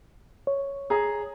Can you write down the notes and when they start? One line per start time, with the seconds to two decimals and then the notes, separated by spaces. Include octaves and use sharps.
0.47 C#5
0.90 G#4 A#5